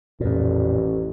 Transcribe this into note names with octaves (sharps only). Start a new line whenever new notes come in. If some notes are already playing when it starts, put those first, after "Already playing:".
A1 F2 A#2